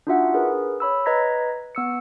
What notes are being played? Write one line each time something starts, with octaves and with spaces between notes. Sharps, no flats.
D4 D#4 F4 F#4 E5 F#5
G#4 A#4 B4
C#5 B5 E6
B4 D#5 A#5 G#6 A#6 B6
B3 E6 C#7